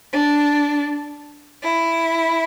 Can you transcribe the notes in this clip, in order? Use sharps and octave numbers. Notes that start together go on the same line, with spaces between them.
D4
E4